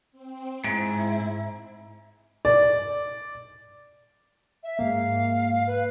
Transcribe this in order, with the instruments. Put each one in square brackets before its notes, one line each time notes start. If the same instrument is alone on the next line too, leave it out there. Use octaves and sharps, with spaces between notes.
[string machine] C4
[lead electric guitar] G#2 [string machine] E4
[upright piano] D5
[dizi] E5
[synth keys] G#2 A#3 [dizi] F5
[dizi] B4